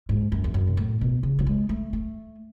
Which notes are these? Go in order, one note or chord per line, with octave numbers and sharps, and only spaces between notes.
G#2
F#2
E2
F#2
B2
A2
B2
C#3
F#3
G#3
A3
A3